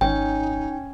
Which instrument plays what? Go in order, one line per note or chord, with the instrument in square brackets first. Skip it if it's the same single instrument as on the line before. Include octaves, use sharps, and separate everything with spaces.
[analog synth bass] G#1 [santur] C#4 [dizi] D#4 [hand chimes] G5